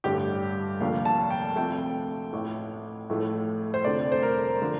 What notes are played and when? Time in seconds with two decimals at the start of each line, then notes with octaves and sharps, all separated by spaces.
0.04 A1 G2 D3 G4
0.80 F1 D#2 D3 F3 F5
1.05 A5
1.30 G5
1.56 D2 C3 F3 A3 G5
2.33 A1 A2 A3
3.09 A1 A2 F3 A3
3.74 C5
3.85 F1 F2 D3 A3 D5
4.12 C5
4.23 A#4
4.62 D3 F3